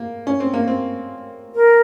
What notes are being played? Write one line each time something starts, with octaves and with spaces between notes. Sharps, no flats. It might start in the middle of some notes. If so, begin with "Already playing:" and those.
Already playing: A#3
C#4
C4
A#3
C4
A#4